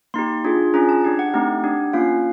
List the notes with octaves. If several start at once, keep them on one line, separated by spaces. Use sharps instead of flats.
A#3 D#4 G4 C6
D4 F4 G#4
C#4 F4 G#4 A#5
A5
D4 G4
F#5
A3 C4 D#4 G4
D4 G4
A#3 C#4 F4 F5